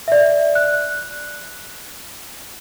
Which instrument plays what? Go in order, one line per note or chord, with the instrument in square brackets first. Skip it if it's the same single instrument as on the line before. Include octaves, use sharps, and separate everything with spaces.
[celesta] D5 E5
F#6